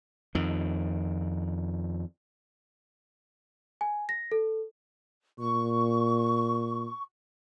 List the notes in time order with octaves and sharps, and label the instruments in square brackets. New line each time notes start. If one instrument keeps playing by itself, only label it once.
[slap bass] F2 D#3
[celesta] G#5
A#6
A4
[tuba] A#2 [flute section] C#6